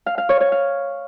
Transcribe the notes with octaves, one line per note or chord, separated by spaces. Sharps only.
F5
F5
C#5
C#5
F5